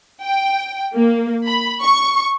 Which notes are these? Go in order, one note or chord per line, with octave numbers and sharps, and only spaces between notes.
G5
A#3
B5
C#6